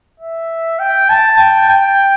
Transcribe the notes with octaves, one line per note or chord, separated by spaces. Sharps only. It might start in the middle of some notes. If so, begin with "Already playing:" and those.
E5
G5
A5
G5
G5